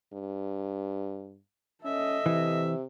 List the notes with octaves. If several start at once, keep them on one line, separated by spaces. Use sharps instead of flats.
G2
C#4 A4 D#5 E5
C3 E3